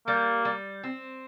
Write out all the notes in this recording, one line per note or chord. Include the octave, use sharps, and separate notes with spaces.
G3 A#3
G3
C4